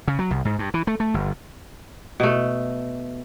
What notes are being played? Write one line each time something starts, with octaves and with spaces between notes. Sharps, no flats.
C#3
F#3
C2
G#2
G2
E3
A3
A3
G1
B2 A3